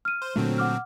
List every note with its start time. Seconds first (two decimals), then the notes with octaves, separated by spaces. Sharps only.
0.05 F6 D#7
0.22 C5
0.36 A#2 D3 F#3 A3 C4
0.58 F#5 D6 F6